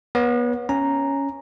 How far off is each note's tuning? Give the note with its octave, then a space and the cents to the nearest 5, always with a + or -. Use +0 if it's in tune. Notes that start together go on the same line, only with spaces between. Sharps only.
B3 -30 C#5 +0
C#4 +0 A#5 +0